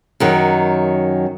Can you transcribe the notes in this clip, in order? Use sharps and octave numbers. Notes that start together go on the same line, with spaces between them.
F#2 D#3 F#3